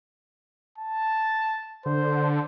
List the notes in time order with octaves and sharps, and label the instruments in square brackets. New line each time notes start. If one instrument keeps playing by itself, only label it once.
[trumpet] A5
[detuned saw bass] D3 [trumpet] C5